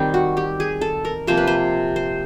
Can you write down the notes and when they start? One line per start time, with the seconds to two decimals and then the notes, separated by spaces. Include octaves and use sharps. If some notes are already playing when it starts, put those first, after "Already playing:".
Already playing: D#3 G3 C4
0.14 F#4
0.37 G4
0.60 G#4
0.81 A4
1.05 A#4
1.27 C3 F3 A#3 C5
1.37 B4
1.47 C5
1.96 C5